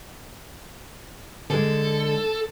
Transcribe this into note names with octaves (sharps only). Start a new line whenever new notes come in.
D3 G#3 A4